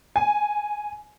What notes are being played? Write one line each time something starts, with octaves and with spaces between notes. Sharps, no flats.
G#5